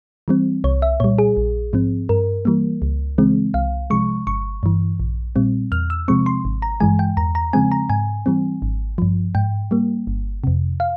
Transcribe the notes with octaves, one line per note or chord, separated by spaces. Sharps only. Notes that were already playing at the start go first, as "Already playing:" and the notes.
E3 G3 C4
C2 C#5
E5
A#2 G3 C#5
G#4
A#1
G#2 F3 C4
G2 A#4
E3 G3 A#3
C#2
C#3 E3 G#3 C4
C2 F5
C3 F3 G#3 C#6
G1 C#6
G2 E3
A#1
A#2 G3 C4
E2 F6
E6
C3 F3 G#3 C4 C#6
C6
G#1
A#5
G2 E3 G#3 G#5
G5
E2 A#5
A#5
C#3 F3 G#3 C4 G#5
A#5
G#2 G#5
E3 G3 C4
G#1
G2 F3
G#2 G5
G3 A#3
G1
F2 C3
F5